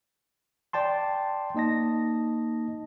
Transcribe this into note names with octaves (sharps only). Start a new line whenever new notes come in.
D5 G5 A5 C6
A#3 D#4 D#5 A5 A#6